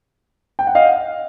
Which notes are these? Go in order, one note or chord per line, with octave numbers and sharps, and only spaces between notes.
G5
F#5
D#5 F5